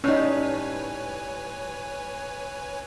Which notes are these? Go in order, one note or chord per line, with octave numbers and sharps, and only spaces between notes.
A2 G3 C#4 D#4 B4 C#5 G#5